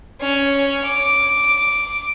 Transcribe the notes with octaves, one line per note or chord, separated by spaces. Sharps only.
C#4 C#5
D6